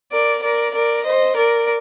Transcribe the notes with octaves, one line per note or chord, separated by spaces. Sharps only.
A#4 D5
A#4 D5
A#4 D5
C5 D#5
A#4 D5